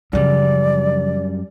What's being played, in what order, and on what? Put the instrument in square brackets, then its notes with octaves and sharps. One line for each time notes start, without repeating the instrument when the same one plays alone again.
[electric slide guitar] F#2 G3 [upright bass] C#3 F3 [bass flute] D5